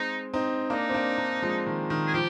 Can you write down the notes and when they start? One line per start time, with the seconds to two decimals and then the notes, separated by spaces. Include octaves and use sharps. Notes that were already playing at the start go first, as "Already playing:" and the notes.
Already playing: G#3 C4 D#4
0.34 C4 D#4
0.70 A#3 D4 D#4
0.90 C4
0.94 A#3 D4
1.18 A#3 D4
1.42 F3 G#3
1.66 D#3
1.90 D#3
2.07 G#4
2.14 F3 G4